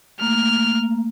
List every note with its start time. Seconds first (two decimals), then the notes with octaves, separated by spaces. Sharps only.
0.21 A3 A#3 F6